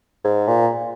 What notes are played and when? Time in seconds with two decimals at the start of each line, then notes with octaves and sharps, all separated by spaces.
0.24 G#2
0.48 A#2